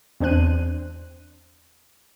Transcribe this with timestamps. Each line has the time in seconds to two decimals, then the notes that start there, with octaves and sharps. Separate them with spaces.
0.20 E2 C4 D4 C5 F#6 D#7